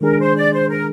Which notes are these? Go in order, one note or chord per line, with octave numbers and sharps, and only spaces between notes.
D#3 G#3 D4 G#4 A#4
C5
D5
C5
A#4